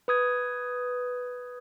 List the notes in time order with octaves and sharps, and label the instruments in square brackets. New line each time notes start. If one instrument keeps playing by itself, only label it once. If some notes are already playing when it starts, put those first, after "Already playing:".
[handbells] B4 D#6 G#6